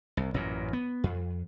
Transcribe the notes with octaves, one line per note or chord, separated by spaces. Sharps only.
C2
A1 F#2 A#2
B3
F2